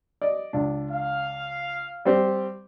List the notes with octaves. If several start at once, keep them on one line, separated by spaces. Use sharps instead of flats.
D5 D#5
C#2 D4
F5
G3 C4 G4